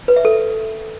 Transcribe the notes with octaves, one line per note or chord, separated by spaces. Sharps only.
B4
E5
A4